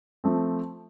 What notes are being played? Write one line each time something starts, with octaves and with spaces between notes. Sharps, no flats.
F3 A3 C4